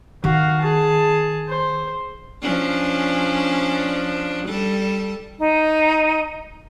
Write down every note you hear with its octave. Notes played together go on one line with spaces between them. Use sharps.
D#3 F#4 F5
G#4 A5
C5
F3 C#4 D4
G3 A4
D#4